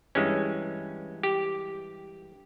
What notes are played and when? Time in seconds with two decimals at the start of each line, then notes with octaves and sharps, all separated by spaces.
0.15 G2 E3 G#3 C#4
1.23 G4